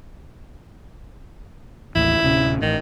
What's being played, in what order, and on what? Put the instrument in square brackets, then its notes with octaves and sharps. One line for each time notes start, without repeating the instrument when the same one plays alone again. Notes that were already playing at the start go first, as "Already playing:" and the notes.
[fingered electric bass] A1 D#2 [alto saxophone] E4
[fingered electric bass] D1 C3 C#4
[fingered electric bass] A1 [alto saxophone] D#3